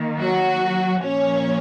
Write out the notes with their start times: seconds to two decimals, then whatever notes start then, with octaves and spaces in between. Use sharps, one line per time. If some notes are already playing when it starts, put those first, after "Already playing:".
Already playing: D#3 A#3
0.19 F#3 F#4
1.03 A#2 F3 A#3 C#4 C#5